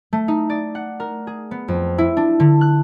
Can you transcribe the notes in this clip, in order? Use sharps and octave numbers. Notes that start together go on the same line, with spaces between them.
A3
D#4
D5
F#5
A#4
G#4
B3
F2
E4
D4
D3
F#6